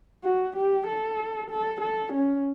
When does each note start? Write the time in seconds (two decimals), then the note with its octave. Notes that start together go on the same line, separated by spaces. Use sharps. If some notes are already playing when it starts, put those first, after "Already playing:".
0.24 F#4
0.56 G4
0.87 A4
1.50 A4
1.81 A4
2.13 C#4